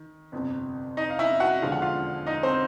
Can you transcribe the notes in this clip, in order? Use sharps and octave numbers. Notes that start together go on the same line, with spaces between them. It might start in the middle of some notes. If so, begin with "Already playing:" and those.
Already playing: D#3
G1 F2 C3
D#4 D#5
F5
E4 E5
F#4 F#5
E1 D#2 D3 F3 G#3 F5
F#5
F4 F5
D#4 D#5
C4 C5